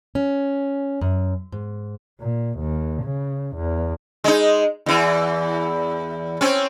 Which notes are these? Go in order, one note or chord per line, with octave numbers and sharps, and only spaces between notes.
C#4
F#2
G#2
A#2
D#2
C#3
E2
G#3 D#4
E2 E3
C4 C#4